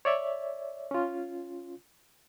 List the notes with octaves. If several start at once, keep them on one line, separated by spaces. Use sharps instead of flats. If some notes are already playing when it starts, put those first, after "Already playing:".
C#5 D5 E5
C#4 F4